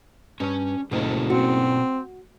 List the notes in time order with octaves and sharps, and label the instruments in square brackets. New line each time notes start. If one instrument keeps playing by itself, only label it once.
[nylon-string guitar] G2 [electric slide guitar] C#4 G#5
[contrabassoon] F#1 [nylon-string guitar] D2 G#2 F#3 [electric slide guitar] B2 F4 A4
[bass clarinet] C4 [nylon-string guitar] F#4